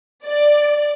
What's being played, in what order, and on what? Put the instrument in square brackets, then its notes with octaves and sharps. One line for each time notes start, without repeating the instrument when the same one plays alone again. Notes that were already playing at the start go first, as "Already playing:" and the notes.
[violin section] D5